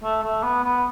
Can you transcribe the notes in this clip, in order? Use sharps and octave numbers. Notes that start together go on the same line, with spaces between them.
A3
A3
B3
B3